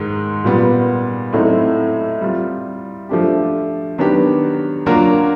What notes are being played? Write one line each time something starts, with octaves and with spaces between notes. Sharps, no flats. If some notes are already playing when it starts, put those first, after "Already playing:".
Already playing: G#2 D#3 G#3
A#2 G3 B3
A2 F#3 A3 C4 D#4
G3 C4 F4
F3 A3 D4 G4
D#3 F#3 B3 D4 G4
F#3 A#3 D4 F4 A#4